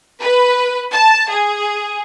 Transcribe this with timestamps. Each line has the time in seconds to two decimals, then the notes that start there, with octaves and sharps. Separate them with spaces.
0.22 B4
0.93 A5
1.29 G#4